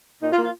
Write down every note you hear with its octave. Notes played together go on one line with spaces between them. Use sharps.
A#2 D#4
F4
A#3
F4